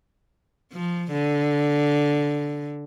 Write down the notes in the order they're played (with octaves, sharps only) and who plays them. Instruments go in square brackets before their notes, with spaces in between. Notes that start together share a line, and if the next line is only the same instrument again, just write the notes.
[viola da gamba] F3
D3